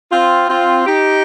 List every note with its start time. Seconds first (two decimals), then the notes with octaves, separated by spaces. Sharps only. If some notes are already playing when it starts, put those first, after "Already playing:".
0.11 C4 F4
0.49 C4 F4
0.86 D#4 G4